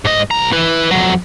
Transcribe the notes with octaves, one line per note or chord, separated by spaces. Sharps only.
G#2 D#5
B1 A#5
E4 B4
F2 F#3